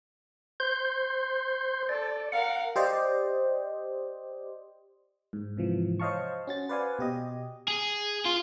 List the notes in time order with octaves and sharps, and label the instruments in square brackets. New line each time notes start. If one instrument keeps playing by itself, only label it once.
[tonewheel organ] C5 C6 G6
[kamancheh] A4 [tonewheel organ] D5
[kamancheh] A#4 F5 [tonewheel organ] F#5
[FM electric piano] G4 C5 D5 D#5
G#2
G#2 C3 E3 F3
C5 C#5 D#5 F5 A5 C#6
C#4 F#4 A6
B4 C5 D5 F5 F#5 G#5
B2 G4 D#5
[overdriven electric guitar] G#4
F4